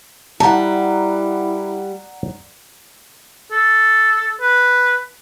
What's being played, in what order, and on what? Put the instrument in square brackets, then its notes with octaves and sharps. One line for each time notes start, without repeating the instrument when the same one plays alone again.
[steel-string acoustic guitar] G3 [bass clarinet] E4 [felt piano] F#5 A#5 [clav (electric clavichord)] A5
[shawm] A4
B4